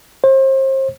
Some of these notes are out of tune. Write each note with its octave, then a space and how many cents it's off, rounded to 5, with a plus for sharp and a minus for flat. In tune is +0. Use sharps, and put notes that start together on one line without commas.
C5 +35